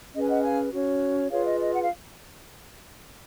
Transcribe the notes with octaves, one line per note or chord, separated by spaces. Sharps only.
C#4 G#4 B4 D#5
G#5
D#5 F#5
F5 G#5
C#4 F#4 C#5
F4 G#4 B4 C#5 F5
D#5
D#5
F#5
F5